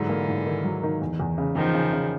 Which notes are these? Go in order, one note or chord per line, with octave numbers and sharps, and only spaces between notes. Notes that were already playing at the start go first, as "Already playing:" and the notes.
Already playing: G#2 D3 E3 F#3
A#3
G#2
D#3
F#3
D#3
E2
E2
C#3
E2 D#3 F3
C#3
C#3